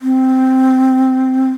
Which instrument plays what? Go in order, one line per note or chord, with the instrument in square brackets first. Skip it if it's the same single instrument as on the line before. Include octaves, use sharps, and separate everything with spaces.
[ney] C4